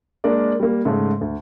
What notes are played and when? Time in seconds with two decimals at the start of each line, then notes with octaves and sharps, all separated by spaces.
0.24 G#3 A#3 D4 A#4 D5
0.60 G3 A#3
0.85 G#2 C#3 A3
1.21 D2